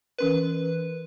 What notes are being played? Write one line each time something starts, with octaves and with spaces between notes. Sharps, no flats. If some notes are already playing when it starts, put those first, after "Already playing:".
E3 C#4 A#4 B4